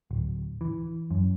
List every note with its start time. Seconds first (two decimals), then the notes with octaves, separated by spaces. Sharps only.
0.11 D1
0.61 E3
1.11 F#2